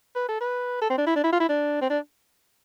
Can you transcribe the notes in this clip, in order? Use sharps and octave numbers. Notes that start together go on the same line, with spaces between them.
B4
A4
B4
A4
C4
D4
E4
D4
E4
F4
E4
D4
C4
D4